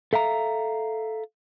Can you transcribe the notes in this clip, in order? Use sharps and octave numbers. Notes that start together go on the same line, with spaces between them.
A4 E5 F5 A#5